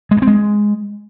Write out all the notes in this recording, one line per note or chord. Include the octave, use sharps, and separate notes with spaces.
G#3
G2
C4
G#3